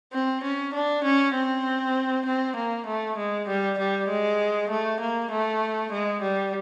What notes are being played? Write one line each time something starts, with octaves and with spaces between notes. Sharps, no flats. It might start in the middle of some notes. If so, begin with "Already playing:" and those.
C4
C#4
D4
C#4
C4
C4
A#3
A3
G#3
G3
G3
G#3
A3
A#3
A3
G#3
G3